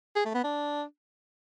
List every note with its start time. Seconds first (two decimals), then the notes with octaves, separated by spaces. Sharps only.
0.15 G#4
0.25 A3
0.34 B3
0.44 D4